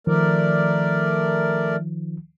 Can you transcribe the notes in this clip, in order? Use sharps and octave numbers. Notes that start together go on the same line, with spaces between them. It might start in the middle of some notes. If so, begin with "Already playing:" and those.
D#3 F3 A3 A#4 D5